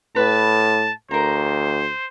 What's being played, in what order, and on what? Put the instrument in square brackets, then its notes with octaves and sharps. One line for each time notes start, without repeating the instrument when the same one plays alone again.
[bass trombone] A2 [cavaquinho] B4 B5 [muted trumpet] A5
[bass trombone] D2 [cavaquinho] A#4 A#5 [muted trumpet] C5